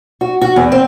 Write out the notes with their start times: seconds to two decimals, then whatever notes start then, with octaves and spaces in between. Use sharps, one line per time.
0.21 F#4
0.41 F#4
0.56 E2
0.72 C4